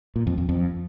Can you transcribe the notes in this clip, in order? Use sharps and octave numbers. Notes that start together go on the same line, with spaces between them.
A#2
F2
F2
F2